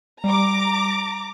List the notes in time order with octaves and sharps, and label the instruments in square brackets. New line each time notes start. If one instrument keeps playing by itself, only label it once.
[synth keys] G3 [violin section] A#5 D6